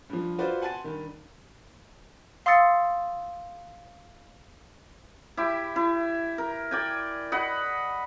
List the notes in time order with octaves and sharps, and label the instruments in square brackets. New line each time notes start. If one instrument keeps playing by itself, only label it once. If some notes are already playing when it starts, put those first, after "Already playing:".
[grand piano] G2 F3
F4 F#4 B4 C5 D5
F#5 G#5 A5 C6 A6 D#7
G2 D#3
[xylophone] F5 C6 D#6 E6 A6 C#7
[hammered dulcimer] E4 G4
E4
A#4
D5 G5 G#5
D#5 F#5 B5